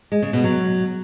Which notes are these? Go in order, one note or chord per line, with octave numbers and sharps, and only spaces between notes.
G#3
C#3
B2
F#3